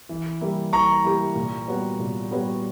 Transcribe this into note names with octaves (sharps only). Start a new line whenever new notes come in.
E3
G3 A#3 E4 G4
E3 A#5 C#6
G3 A#3 E4 G4
A#2
G3 B3 F#4 C#5
A#2
G3 B3 F#4 C#5